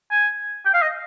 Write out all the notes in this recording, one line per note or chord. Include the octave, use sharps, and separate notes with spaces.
G#5
G5
F5
D#5